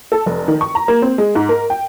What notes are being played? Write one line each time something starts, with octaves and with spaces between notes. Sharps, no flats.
A4
F1
D#3
C#6
A#5
A#3
C4
G#3
G#2
A#4
G5